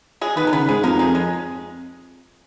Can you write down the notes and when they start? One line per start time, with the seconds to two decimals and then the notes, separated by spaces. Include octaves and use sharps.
0.21 G#3 G#4
0.37 D#3 B3 B4
0.47 A#4
0.52 C#3 B3 B4
0.68 G#2 G#3 G#4
0.83 F2 A#3 A#4
0.99 G#3 G#4
1.15 G#3